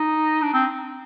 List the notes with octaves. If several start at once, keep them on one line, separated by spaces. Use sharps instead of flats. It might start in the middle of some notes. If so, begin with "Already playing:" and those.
Already playing: D#4
D4
C4